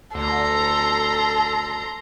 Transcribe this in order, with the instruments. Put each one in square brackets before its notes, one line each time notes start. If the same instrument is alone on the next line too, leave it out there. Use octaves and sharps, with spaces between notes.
[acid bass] D2 [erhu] A4 [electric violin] A#5 C6